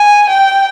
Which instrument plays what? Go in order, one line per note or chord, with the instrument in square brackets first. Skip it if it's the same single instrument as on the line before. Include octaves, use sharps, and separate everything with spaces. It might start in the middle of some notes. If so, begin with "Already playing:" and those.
Already playing: [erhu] G#5
G5